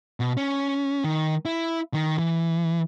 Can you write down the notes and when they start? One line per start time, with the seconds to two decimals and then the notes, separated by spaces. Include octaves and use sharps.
0.20 B2
0.37 C#4
1.04 D#3
1.45 E4
1.94 D#3
2.18 E3